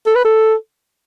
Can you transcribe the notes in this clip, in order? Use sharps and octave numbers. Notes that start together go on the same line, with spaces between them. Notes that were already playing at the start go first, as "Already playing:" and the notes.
A4
B4
A4